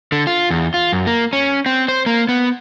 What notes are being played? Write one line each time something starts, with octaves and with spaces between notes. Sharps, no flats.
D3
F4
E2
F4
F#2
A#3
C#4
C4
C5
A#3
B3